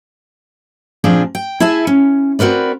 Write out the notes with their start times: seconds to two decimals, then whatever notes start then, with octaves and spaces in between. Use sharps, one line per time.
1.04 A#2 F3 C4 D4 G#4
1.35 G5
1.60 E4 G#4 E5 G#5 A5
1.87 C#4
2.39 C4 F#4 A#4 B4 D5